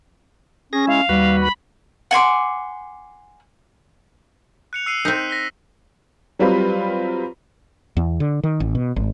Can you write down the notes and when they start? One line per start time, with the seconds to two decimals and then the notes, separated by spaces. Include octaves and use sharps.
0.73 C#4 G#4 A#6
0.87 G#3 E4 F5
1.09 D#2 G3 F#4 B4
1.41 B5
2.11 F#5 G#5 C6 D6
4.73 F#6 C#7 F7
4.86 E6 C7 D#7
5.05 C4 D#4 F#6 B6 D#7
5.30 A#6 B6 G7
6.39 F#3 G3 C4 F4 B4
7.97 E2
8.20 D3
8.43 D#3
8.60 A1
8.75 B2
8.96 G#1